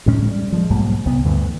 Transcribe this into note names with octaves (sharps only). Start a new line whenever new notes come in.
D2 A2 G#3 C#4
G3
F3 G3 G#3
B1 G#2 G3 A#3
C2 B3
D2 G2 D3 E3